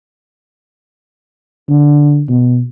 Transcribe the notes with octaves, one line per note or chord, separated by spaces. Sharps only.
D3
B2